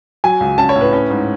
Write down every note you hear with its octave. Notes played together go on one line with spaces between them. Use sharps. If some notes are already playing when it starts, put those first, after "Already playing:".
F#3 G#5
C#2
C#4 A5
C#5
A2
B4
C#4
G#2